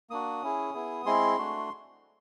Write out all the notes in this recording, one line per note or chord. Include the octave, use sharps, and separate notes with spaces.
A#3 D4 F#4 D#6
C#4 E4 G#4
B3 E4 G#4
G#3 C4 E4 G#4 C6
A3 D4 F#4